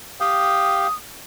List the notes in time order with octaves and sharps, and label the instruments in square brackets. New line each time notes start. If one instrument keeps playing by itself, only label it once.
[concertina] G4 F5 G5 [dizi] D#6